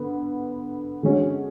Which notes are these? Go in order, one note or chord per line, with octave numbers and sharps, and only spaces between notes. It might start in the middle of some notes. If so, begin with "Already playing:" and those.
Already playing: D3 B3
D3 G#3 C#4 F#4